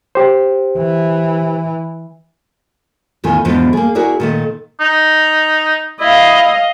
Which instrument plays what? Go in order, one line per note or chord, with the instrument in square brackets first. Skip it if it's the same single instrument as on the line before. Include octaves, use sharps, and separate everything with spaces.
[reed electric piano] G4 C5
[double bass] E3
[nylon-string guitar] E2 A2 D#3 F4 G#5
E2 G#2 B2 D3 F3
A#3 G#4
E4 F#4 G#4 A#4 D5
A#2 D#3 A3
[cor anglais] D#4
[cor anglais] E4 [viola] D#5 F5